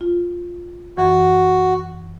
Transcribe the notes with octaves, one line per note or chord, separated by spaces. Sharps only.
F4
F#2 E3 F#4